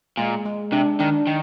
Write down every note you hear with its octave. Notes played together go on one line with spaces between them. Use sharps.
A#2 G#3
G#3
C3 D4
D#3 D4
D#3